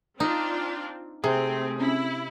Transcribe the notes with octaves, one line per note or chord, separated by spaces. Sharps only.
C4 D4 D#4 F4
C3 A3 C4 G#4
C4 C#4 E4